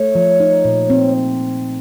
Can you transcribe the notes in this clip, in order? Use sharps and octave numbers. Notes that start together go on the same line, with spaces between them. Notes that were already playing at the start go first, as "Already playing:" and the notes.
Already playing: A3 C#5
F3
D#4
A#2
C4